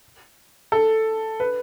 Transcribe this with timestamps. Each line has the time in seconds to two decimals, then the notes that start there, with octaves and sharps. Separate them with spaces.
0.72 A4
1.40 B4